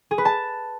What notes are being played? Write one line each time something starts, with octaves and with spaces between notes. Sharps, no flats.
G#4
B4
A5